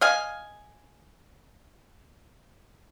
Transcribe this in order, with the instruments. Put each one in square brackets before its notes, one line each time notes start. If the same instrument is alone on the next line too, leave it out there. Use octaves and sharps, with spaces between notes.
[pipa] D#5 F5 G#5